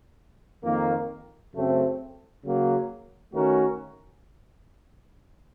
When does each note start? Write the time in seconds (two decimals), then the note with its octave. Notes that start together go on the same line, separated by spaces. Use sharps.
0.63 F2 D#3 A#3
1.53 F#2 C#3 A3 C4
2.43 C#3 F#3 A#3
3.33 D#3 A3 C#4 F#4 A#4